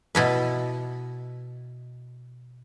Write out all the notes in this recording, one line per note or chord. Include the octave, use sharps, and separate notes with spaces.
B2 E4 B4